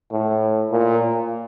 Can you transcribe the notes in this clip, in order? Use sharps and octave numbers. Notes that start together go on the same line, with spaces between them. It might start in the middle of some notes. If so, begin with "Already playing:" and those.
A2
A#2